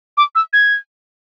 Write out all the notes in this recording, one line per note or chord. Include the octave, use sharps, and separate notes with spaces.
D6
E6
G#6